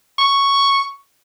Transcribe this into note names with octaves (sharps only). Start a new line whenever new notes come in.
C#6